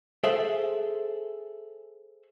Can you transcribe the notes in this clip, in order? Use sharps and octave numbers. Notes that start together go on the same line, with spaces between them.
G#4 A4 C5 E5